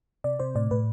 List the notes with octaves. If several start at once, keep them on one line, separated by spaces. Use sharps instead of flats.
C3 D5
C3 C5
A2 D5
A2 B4